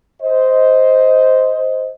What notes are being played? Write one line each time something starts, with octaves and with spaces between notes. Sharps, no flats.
C5 D#5